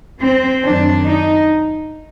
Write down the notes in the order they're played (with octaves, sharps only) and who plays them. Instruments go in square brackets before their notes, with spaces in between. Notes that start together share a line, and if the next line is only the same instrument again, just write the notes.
[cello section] C4
F#2 D#3 D4
D#4